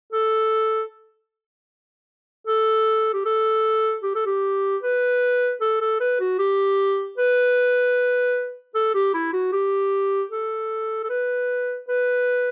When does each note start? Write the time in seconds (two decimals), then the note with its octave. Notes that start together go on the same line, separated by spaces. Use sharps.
0.12 A4
2.47 A4
3.14 G4
3.26 A4
4.03 G4
4.15 A4
4.26 G4
4.83 B4
5.61 A4
5.81 A4
6.01 B4
6.20 F#4
6.39 G4
7.18 B4
8.75 A4
8.95 G4
9.14 E4
9.33 F#4
9.53 G4
10.31 A4
11.03 A4
11.09 B4
11.88 B4